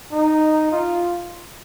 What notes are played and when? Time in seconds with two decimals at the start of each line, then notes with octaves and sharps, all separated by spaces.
0.12 D#4
0.72 F4